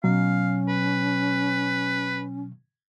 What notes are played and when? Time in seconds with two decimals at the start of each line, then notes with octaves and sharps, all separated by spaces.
0.04 B2 F#3 C#4 F5
0.68 B4